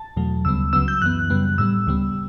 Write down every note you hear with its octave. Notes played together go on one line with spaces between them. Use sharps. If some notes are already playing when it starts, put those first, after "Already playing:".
Already playing: A5
E2 B2 F#3 A3
D2 C#3 G3 B3 E6
C#2 C#3 F#3 B3 E6
G6
F#2 E3 B3 F#6
F#2 C#3 G3 B3
A2 G3 B3 E6
D2 C#3 G3 B3